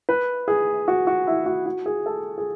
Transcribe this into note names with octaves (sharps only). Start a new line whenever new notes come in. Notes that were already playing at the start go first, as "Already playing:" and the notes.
B4
G#4
F#4
F#4
E4
F#4
F#4
G#4
A4
G#4